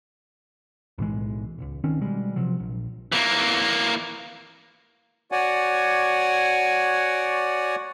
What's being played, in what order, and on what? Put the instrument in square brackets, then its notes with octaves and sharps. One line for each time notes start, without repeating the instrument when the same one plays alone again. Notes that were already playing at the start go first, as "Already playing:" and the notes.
[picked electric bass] B1 A2 E3 G#3
D1 C#2
D#3 C4 C#4
B2 G3 G#3
C3 F3 F#3
A#1
[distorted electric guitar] E3 A#3
[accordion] F#4 C#5 D5 F#5 G#5